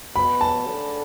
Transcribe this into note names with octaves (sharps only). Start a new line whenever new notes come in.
B2 B5
A5
D3